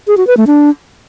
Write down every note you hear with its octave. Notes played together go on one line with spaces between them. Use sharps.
G#4
F#4
B4
A3
D4